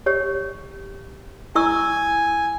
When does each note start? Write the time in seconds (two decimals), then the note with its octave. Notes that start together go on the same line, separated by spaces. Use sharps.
0.06 G4 C#5
1.55 E4 G#5 C#6 E6